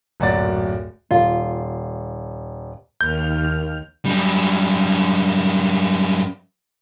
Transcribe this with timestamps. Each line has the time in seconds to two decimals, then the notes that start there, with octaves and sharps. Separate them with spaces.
0.20 D1 F#2 A#2 F#4 D5 A6
1.11 D#1 F4
3.01 D#2 F6 G6
4.06 F#2 G3